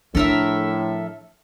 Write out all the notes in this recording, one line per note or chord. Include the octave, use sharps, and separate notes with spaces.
A2 F3 D4 A4 A#4 E5